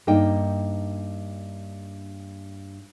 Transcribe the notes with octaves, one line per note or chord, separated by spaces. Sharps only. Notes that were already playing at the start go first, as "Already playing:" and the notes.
G2 A#3 D#4 G5